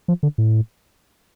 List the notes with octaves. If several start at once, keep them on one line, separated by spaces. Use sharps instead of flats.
F3
D3
A2